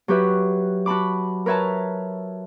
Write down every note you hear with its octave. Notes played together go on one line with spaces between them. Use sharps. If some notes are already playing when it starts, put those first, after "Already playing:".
F#3 F#4 G4 B4 E5
F#4 A5 B5 D6
A#4 B4 C#5 E5 A5 A#5